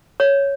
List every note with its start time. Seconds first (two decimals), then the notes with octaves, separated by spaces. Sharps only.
0.20 C#5